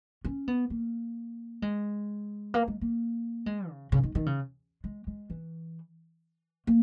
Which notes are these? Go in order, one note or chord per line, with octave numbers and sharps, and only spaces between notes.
C#4
B3
A#3
G#3
A#3
G#3
A#3
G#3
C#3
C#3
D#3
D#3
C#3
G#3
G#3
E3
A#3